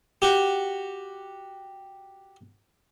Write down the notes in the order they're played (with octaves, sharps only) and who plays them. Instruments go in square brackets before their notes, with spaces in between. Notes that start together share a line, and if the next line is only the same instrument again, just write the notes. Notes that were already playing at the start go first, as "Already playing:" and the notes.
[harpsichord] F#4 G4